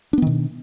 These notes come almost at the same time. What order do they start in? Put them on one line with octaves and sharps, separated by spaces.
D4 B3 D#3 B2